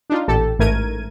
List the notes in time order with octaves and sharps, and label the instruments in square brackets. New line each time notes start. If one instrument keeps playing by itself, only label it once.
[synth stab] D4 D#4 F4
A1 A#2 G4 A4 A5
A1 G#2 A3 A#4 G#6 D#7